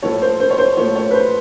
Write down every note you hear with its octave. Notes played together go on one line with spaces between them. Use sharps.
A2 F3 A3 C#5
C5
C5
C#5
C5
A2 F3 A3 C#5
C#5
B4
C5